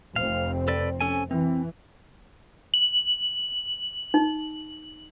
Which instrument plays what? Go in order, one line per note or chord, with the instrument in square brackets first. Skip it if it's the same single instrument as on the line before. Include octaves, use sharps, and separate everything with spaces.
[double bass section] F1 F2 C4 [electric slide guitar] F5
[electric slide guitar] A4 B4 D5
C#4 A4 G#5
[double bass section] E3 [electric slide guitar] C4
[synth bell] F#7
[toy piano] D#4